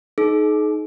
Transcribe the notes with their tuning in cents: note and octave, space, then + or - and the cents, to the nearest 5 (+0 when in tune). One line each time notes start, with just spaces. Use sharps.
D#4 +0 G#4 +45